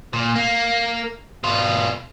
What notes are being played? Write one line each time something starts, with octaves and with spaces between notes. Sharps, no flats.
A#2
A#3
B2 F4